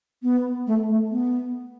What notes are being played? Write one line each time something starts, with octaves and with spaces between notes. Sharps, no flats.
B3
A3
A3
B3